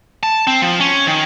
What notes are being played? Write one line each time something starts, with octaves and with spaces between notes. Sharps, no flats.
A5
C4
F3
C#4
D#3